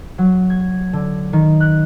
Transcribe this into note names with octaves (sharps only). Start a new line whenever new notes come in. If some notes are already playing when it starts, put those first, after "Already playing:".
F#3
G#6
D3
D#3
F#6